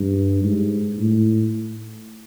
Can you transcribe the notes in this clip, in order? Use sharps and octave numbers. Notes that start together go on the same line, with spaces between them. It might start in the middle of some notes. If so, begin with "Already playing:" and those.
Already playing: G2
G#2
A2